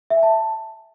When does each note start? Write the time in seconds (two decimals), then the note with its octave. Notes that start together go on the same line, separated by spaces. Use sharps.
0.10 E5
0.17 G#5
0.23 A5